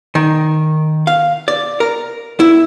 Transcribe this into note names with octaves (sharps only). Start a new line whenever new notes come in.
D#3
F5
D5
A#4
E4